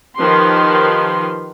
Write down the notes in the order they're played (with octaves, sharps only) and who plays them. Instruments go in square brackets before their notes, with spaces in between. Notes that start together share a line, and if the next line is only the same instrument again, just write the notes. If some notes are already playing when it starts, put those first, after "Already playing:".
[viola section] D#3 F3 G4 B4 C6